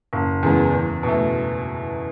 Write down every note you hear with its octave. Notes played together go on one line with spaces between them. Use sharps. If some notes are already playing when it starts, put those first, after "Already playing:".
F#1
E2 C#3 G#3 B3
E2
B2
A3